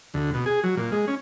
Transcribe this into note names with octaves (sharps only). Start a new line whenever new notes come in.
D2
B2
G#4
F#3
A#2
G#3
C#4